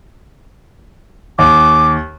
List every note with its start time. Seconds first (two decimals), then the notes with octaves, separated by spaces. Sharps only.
1.39 D#2 D6